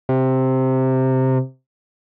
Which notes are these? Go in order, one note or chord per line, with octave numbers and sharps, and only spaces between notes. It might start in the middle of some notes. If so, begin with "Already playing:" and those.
C3